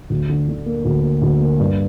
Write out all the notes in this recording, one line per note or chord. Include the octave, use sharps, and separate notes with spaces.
D2
D3
D3
A#3
D2
A#3
D2
A#3
G2